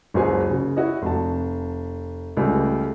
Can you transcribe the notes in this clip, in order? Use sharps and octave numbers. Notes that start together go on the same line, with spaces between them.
F#1 C#2 F#3 G#4 C5 G#5
C#3
E4 F#4 C#5 D#5
F1 A5
C#2 C#3 G3 A3